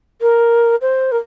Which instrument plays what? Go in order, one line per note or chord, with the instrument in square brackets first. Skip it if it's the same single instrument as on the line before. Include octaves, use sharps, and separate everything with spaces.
[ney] A#4
C5
A#4